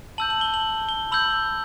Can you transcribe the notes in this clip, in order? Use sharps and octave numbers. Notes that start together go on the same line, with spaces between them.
A5 E6 G6 F#7
F#7
G7
F#7
G7
B5 E6 G6 F#7